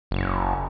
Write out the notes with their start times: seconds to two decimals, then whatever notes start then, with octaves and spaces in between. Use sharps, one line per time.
0.11 F#1